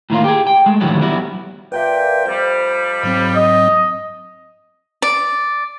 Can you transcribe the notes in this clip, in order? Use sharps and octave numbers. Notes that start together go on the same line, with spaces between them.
A2 D#3 A#3 F4
G4 G#4
G5
G#3 A3
F2 A2 D3 D#3 F#3 G3
F#3 G3 B3 E4 F#4
A#2 B4 E5 G5
F2 G3 C5
G#2 F#3 C4
D#5
D5